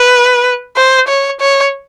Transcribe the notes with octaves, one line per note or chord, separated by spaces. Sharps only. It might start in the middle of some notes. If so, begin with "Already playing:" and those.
Already playing: B4
C5
C#5
C#5